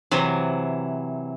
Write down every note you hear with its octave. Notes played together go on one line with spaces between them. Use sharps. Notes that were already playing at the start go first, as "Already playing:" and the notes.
C3 E3 F#3